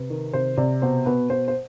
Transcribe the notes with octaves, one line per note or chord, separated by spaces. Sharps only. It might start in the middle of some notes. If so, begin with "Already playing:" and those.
Already playing: C3 B4
D#3
C3 C5
C3 D5
B2 C5
B2 B4
B2 C5
C5